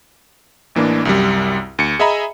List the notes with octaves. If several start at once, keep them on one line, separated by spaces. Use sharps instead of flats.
A1 E3 A#3 D4
C2 F#2 G3
D2 C#7
G#4 D#5 E5 G#5 A#5 B5